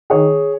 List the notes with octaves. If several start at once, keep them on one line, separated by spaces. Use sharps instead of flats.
D#3 G#4 C#5